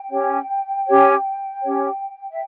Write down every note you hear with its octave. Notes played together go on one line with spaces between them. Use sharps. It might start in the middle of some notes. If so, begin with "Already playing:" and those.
Already playing: G5
C#4 G4 C#5
C#4 G4 C#5
C#4 G4 C#5
E5